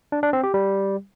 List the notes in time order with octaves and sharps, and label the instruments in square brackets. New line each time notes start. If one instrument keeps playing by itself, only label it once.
[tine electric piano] D4
D4
C4
G4
G3